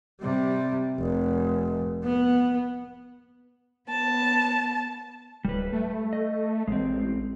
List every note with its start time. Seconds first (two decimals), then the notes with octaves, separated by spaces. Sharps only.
0.21 C3 G3
0.99 F1
2.04 B3
3.89 B3 A5
5.45 D1 G3 B4
5.73 A3
6.13 D#5
6.68 A1 G#3 C4